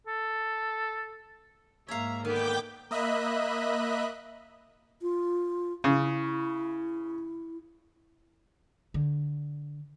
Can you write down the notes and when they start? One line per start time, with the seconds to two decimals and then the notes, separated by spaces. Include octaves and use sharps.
0.07 A4
1.88 G#2 A#3 C#5 E5 F5 A#5
2.25 D3 D#3 B3 B4 G5 D6 G6
2.91 A#3 D#5 E5 B5 F#6
5.02 F4
5.84 C#3 E4
8.94 D3